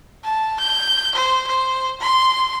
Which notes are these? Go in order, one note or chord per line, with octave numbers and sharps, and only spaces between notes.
A5
G6
C5
C5
C6